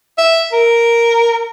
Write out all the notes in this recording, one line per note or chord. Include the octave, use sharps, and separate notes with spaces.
E5
A#4